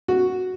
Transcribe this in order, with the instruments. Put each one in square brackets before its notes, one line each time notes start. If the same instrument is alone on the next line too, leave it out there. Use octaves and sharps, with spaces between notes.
[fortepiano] F#4